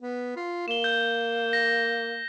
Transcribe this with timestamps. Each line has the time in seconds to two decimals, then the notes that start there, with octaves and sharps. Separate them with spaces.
0.02 B3
0.36 F4
0.68 A#3 E7 G7
0.84 G6
1.53 A#6